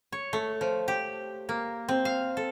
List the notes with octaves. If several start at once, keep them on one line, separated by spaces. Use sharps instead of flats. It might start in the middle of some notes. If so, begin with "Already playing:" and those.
C#5
A3
F3
G4
A#3
C4
F5
A4